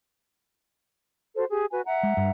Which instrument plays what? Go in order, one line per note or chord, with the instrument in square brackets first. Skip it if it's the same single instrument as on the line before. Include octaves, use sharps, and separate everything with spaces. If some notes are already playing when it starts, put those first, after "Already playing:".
[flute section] F#4 A4 C5
G4 G#4
F#4 B4 G#5
E5 F#5 A#5
[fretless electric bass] G#3
G2